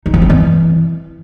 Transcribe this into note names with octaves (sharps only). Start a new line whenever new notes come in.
D#4
F3
C4
E3